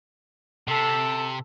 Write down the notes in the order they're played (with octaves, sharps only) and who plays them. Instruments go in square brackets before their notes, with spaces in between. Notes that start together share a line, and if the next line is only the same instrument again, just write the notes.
[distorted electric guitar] C3 [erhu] A4